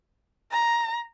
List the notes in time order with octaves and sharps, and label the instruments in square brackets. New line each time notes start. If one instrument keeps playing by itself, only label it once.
[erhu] A#5